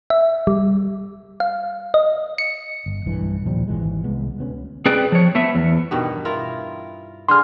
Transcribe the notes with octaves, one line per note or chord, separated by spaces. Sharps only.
E5
G3
F5
D#5
C#7
G1
D1 B1 G2 E3
D#2 A#2 F3 G3
G#1 C#2 E3 G#3
C2 G#3 B3
D2 B3 C#4
C4 G#4 B4 D5 G5
F3 C#5
A3 B3 E5
E2
G2 B2 D#3
E4 F4 A#4
D3 G#4 C6 F6